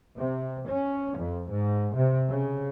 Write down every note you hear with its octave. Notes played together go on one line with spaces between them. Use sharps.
C3
C#4
F2
G#2
C3
C#3